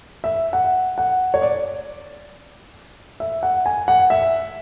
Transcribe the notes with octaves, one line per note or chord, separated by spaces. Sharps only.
E5
F#5
F#5
C#5
D5
E5
F#5
G#5
F#5
E5